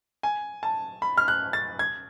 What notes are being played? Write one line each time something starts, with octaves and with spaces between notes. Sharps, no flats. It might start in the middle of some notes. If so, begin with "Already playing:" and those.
G#5
A5
B5
F6
F#6
A6
G#6